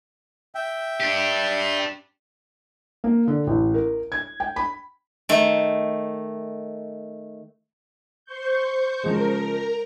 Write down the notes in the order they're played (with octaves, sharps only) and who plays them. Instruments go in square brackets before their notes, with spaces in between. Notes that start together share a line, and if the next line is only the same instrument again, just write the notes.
[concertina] E5 G5
[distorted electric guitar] D4 G4
[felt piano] A#3
D3
A1
A#4
G#6
G5
B5
[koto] D#3 A3
[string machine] C5 C#6 G6
[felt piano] C#3 F3 G#3 [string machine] A#4 A#5